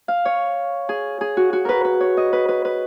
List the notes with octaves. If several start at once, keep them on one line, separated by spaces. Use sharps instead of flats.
F5
C#5
G#4
G#4
F#4
F#4
A#4 B4
B4
C#5
D#5
B4
B4
B4